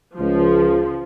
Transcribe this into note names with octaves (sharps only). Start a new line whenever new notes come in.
C#2 F3